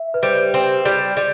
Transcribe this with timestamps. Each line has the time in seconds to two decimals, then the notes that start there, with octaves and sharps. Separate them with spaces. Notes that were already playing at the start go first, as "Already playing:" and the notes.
Already playing: E5
0.14 B4
0.22 G3 C5
0.54 C4
0.85 G3 D5
1.17 G3